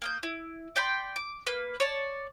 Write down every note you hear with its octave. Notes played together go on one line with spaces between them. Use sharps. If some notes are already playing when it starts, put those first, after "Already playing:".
A#3 D#6 G6
E4
D5 G5 B5 C6
D6
A#3 B4
C#5 D5 A5